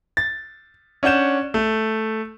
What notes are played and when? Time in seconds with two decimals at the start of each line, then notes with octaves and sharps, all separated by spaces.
0.17 A6
1.03 C#4 D4 F#5 G6 E7
1.54 A3